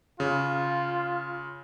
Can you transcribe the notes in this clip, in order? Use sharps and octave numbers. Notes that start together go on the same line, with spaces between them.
C#3 F4